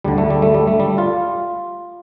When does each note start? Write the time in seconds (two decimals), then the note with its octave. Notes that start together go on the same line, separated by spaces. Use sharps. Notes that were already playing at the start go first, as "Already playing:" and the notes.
0.04 D2 D3 G3
0.18 A3
0.30 G3
0.42 A3
0.54 G3
0.67 A3
0.80 G3
0.98 F4